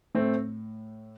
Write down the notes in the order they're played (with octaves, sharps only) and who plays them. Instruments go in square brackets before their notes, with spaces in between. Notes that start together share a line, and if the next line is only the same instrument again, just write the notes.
[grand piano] A2 A3 C4